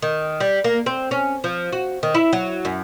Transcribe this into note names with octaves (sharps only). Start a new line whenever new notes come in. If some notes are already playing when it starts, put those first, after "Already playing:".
D#3
G3
A#3
C4
C#4
F3
F#4
D#3
E4
F#3
F#2